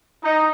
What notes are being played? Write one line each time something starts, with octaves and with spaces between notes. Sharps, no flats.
D#4